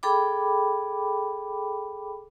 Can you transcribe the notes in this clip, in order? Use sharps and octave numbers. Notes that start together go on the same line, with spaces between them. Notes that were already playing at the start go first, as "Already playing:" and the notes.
G#4 A4 G5 B5 D6